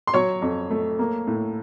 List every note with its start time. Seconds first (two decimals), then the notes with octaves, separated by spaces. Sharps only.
0.07 C6
0.14 F#3 C#5 C#6
0.42 F2
0.70 A3
0.99 A#3
1.27 A2